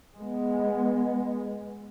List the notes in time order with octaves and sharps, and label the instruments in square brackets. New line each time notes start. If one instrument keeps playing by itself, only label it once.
[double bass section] G#3 B3